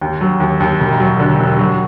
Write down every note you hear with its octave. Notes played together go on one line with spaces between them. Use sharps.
D#2
F#3
D#2
D#2
E1
F#3
D3
E1
F#3